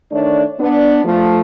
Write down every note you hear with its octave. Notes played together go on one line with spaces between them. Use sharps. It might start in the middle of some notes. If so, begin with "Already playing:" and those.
D#3 A3 D4 C#5 D5
B3 D4
F3 A3